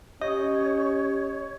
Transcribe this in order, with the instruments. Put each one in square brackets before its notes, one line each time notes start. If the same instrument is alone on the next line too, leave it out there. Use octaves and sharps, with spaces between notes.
[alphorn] C#4 [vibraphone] G4 [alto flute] C#5 [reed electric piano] D#5